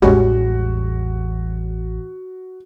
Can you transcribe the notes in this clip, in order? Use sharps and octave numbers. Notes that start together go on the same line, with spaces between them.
A1 E2 G3 G#3 C#4 F#4